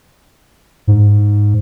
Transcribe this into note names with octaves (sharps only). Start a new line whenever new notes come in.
G#2